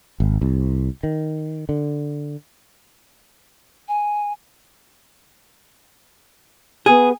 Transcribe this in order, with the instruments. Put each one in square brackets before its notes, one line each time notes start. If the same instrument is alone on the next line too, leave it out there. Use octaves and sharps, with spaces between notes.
[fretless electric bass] G#1
C2
D#3
D3
[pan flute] G#5
[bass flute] B3 [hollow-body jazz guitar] G#4